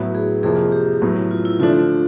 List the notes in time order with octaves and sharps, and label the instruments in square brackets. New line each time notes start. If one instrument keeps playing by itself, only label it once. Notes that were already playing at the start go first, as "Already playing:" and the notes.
Already playing: [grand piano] A2 F#3 B3 E4 [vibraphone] F#4
[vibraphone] G#4
[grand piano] F2 C3 F3 A#3 [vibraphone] G#4
[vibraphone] G4
[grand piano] A2 F#3 B3
[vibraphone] F4
E4
[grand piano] D3 F3 A3 D4 [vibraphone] F4
[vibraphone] F4